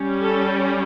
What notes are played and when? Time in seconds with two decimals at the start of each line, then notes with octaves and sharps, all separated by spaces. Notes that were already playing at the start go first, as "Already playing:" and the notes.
Already playing: G3 C#4
0.22 A4